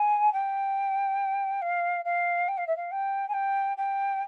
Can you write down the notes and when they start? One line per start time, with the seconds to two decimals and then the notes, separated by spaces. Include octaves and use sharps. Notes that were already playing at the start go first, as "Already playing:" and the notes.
Already playing: G#5
0.32 G5
1.61 F5
2.05 F5
2.48 G5
2.57 F5
2.67 E5
2.76 F5
2.91 G5
3.28 G#5
3.33 G5
3.77 G5